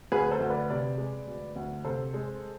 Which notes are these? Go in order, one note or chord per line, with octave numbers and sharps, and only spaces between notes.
D2 G#4 B4
A4 C5
D2
B4 D5
C3 B4 D5
G#3
D2
D2
C3 A4 C5
G#3